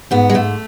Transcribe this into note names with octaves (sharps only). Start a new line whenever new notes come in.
G#2 B3
G#3
G#2 A3